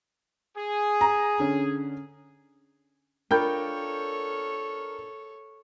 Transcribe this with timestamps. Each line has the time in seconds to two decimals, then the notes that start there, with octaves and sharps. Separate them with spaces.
0.56 G#4
1.01 A#5
1.39 D3 C#4
3.31 D4 F4 A4 A#4 C#5 G5 B5 G6